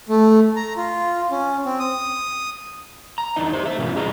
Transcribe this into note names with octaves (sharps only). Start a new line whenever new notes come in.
A3
A#5
F4
C#4
C4
D#6
A#5
E2 D4 D#4 D#5
G4 C5
A3 E5
B2 E3 C#4 F4
E2 G3 G#4 D#5 A#5